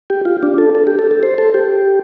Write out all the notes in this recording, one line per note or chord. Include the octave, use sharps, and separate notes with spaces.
G4
F4
D4
A4
A4
G4
A4
A4
C5
A4
G4